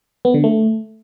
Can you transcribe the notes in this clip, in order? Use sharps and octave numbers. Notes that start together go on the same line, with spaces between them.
B3
D3
A3